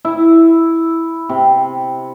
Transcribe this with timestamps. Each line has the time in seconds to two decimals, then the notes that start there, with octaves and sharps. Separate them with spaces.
0.05 E4
1.29 C3